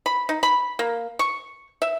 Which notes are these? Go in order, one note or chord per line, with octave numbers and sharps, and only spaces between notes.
B5
D#4
B5
A#3
C#6
E5